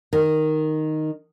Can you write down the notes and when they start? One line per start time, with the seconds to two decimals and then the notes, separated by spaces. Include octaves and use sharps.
0.13 D#3